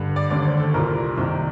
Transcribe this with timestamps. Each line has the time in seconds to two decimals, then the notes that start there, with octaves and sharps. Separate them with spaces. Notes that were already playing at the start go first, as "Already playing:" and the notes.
Already playing: G2 D3
0.16 D5
0.30 D#2 D3 D5
0.46 C5
0.60 A4
0.74 C2 A#2 A#4
1.17 C2 C3 D#3